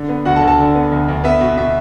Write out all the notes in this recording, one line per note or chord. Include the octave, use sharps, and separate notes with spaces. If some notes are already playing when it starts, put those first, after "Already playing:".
Already playing: D3
B3
D2 F#4 F#5
A4 A5
D2
A4 A5
D3
B3
D2
D2
B3 E5
B2
B2 E5